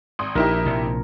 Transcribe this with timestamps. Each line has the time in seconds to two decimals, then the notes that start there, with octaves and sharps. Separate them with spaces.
0.19 G#1 C6 D#6
0.35 A#1 D#4 E4 G4 A#4
0.66 A#1 C3